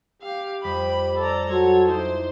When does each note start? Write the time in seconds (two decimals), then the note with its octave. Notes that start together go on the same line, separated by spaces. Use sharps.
0.22 G4 F5
0.64 F2 G3 B5 B6
1.18 A4 D5 A#5
1.50 F#3 A4 C#5 C6
1.87 D#4 E4 G4 C5